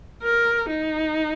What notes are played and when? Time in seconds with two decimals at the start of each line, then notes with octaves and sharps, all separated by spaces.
0.23 A#4
0.69 D#4